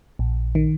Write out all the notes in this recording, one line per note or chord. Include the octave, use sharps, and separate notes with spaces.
A#1
D#3